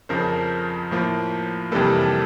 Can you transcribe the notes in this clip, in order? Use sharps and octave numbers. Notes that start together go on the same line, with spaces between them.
F2 C#3 F3 A#4 C5
A2 F3 A#3
F2 C3 E3 G3 A#3 A4 B4
A4